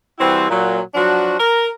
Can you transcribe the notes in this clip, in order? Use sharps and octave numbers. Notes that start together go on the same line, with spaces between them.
E3 G3 C4 E4 F#4 C5
A#2 F#3
F3 F#3 D4 F#4
A#4